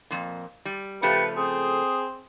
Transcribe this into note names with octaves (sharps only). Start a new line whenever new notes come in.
F2 A#2
G3
C#3 F3 A3 G4 B4 C#7
C4 G#4 D#6